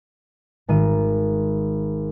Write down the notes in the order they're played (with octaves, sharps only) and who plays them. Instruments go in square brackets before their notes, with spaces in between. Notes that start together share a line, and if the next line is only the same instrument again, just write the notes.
[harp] G#1 D#3 D#7